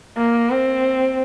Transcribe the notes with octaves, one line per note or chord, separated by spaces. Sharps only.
A#3
C4